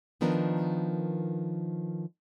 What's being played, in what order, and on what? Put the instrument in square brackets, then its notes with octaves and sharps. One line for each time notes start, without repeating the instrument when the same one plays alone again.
[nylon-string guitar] D#3 F3 B3 D4 A#4